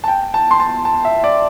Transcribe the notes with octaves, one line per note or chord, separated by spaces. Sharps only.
A5
G5
A5
C6
A5
A5
E5
D5